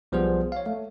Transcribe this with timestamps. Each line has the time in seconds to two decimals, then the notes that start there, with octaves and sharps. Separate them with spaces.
0.12 B1 F3 G3 B3 G#4 C5
0.52 C#5 F5
0.66 A3